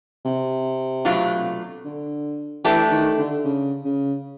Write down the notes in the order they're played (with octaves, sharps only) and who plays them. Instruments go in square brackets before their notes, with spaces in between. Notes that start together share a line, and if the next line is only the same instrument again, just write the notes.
[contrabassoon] C3
[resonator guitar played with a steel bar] B2 F#3 A3 D4 F4
[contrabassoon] D3
[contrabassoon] E3 [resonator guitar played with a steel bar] A3 D4 G4
[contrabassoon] D#3
D3
C#3
C#3